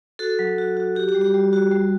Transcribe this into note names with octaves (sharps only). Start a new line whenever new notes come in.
F#4 A4
F#3
F#4
F#4
F#4 G4
G4
G3
G4
G3
F#4
G3